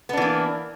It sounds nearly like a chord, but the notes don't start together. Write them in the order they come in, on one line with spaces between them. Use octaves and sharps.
B3 D4 E3 A#3